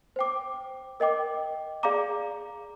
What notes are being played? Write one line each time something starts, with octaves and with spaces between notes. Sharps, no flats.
C5 G5 D6
A#4 D#5 G5 D6
G#4 D5 F5 A#5 D6